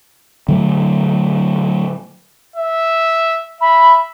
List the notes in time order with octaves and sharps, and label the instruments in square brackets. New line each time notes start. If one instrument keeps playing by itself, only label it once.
[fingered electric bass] D3 F#3 A3
[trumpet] E5
[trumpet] E5 [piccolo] B5